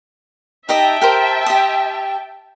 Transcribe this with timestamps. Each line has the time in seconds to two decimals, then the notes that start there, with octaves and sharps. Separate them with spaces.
0.69 D#4 G4 D#5 E5 G5 A5
1.01 G4 A#4 C5
1.46 G4 C6 D#6